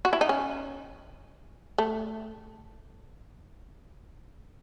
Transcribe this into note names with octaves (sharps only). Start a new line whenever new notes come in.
F#4
E4
D#4
C#4
A3